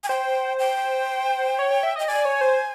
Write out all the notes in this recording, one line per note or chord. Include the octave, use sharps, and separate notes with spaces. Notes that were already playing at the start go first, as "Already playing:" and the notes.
G#5
C5 G5
G5
C#5
C#5
E5
D#5 G5
D5 G#5
C#5
C5